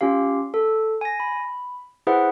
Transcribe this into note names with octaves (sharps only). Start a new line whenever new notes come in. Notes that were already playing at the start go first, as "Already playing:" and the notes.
C#4 F4 G4 F5
A4
G#5 A#6
B5
E4 G#4 B4 C5 E5 F#5